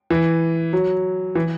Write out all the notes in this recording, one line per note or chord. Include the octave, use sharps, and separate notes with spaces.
E3
F#3
E3